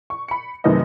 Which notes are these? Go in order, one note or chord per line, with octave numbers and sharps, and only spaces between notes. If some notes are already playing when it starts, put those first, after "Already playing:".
C#6
B5 C#7
F#2 C3 D#3 A3 B4 D#5